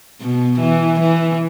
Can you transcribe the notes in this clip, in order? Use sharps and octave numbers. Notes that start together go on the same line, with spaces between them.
B2
E3
E3